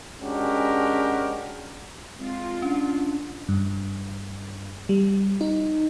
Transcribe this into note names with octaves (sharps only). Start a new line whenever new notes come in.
G#3 C#4 D4 F#4 G4 A#4
G#3 C4 F4
C#4 D4
G2
G3
D#4